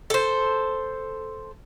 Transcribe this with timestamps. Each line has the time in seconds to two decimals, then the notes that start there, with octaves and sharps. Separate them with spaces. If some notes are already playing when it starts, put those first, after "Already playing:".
0.10 A4 C5